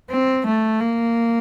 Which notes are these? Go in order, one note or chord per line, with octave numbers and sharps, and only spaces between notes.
C4
A3
A#3